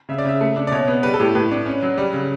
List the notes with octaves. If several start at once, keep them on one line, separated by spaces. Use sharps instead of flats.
C#3 E5
D5
C#3 E5
A3
D4
D5
B2 C#5
B3
G3 B4
A4
A2 G4
A2 B4
D4
C#4
F#3
G3
C#3